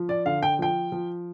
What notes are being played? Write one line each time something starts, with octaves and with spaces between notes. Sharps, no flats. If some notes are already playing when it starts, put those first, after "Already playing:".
Already playing: F3
D5
D3 F5
G5
F3 G5
F3